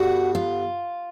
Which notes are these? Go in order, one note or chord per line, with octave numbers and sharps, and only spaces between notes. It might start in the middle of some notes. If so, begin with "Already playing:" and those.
Already playing: G2 D3 G3 B3 F#4
F4